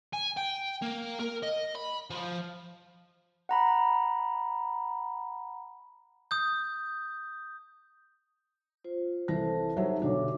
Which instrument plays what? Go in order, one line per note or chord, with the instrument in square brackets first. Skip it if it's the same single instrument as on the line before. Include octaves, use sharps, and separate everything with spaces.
[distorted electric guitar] G#5
G5
A#3
A#4
D#5
B5
F3
[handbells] F#5 A#5 B5
[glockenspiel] D#6 G6
[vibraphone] F4 C5
[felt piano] C2 E3 A#6 [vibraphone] A4 C5 A5
[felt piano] F#3 C#5 E5 [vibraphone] D#4 G4
[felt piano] B1 D3 D4 [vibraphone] F#4 C#5 D6